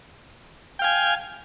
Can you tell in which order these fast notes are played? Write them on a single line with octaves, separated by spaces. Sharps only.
G5 F5 G#5